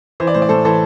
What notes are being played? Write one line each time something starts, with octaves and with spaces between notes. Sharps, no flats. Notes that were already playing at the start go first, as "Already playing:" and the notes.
E3 C5
D5
A2 C5
D5
A2 A4 C5
E3 A4 C5